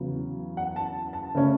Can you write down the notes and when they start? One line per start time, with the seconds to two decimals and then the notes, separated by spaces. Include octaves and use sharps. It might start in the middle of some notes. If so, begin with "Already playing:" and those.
Already playing: E2 C#3 F#3 B3
0.57 F#5
0.76 A5
1.13 A5
1.35 C#3 A3 C#4